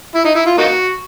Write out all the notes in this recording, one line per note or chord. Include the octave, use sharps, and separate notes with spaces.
E4
D#4
E4
F4
A#3 D#4 F#4